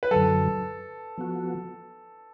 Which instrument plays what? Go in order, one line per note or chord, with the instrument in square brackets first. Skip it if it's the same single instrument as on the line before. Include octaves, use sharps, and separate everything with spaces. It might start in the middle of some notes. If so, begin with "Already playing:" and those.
[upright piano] B4
[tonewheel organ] F#2 D3 F#3 [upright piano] A4
[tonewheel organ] F3 B3 F#4